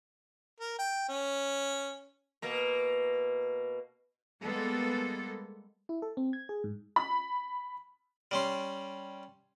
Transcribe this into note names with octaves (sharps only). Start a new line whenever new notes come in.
A#4
G5
C#4
B2 A#3
G3 G#3 A#3 B3 A4
E4
A4
C4
G#6
G#4
G#2
B5
G3 C#4 C6